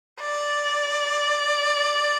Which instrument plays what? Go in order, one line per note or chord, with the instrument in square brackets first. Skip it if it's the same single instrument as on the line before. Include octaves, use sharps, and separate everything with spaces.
[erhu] D5